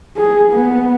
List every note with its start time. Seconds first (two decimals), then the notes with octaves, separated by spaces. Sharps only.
0.17 G#4
0.52 B3